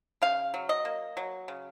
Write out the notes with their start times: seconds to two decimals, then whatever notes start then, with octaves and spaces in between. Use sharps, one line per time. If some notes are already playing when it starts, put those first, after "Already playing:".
0.22 C#3 F5
0.54 F#3
0.69 D#5
0.85 A#3
1.17 F#3
1.48 C#3